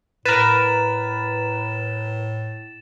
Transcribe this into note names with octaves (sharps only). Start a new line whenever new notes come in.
A2 A#4 B4 A6 E7